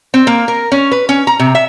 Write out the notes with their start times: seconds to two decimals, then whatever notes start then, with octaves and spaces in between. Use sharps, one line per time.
0.14 C4
0.27 A#3
0.48 A#4
0.72 C#4
0.92 B4
1.09 C#4
1.27 A#5
1.40 C3
1.55 E5